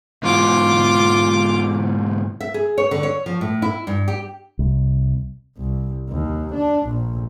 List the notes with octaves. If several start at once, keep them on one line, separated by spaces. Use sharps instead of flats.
G#2 B2 E3 F4 D6
E5
G#4
C#5
D3
C#5
F3
A2
E4
G2
G4
C2
C2
D#2
D4
A#1